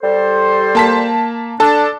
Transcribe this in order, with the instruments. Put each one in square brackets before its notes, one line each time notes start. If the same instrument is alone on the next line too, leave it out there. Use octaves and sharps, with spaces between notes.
[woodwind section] G3 A4 C5
[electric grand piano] A#3 A5 B6
[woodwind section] D4 [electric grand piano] A4 A5